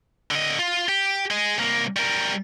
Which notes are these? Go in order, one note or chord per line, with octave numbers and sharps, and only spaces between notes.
D3 D#5
F4
G4
G#4 D#5
C2 A#3
G3 A#4